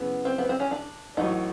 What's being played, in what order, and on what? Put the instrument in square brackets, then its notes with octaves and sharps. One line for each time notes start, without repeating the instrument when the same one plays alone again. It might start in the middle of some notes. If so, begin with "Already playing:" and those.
Already playing: [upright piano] F#2 C#3 E3 G#3 [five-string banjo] B3
[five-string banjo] C4
B3
C4
C#4
D4
[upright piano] A1 A2 F#3 [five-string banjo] D#4